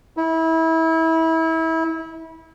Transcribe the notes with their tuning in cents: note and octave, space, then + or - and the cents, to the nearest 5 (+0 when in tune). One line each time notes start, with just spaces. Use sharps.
E4 -25